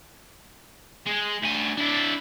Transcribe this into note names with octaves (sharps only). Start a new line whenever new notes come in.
G#3
D2 G#5
D4 E4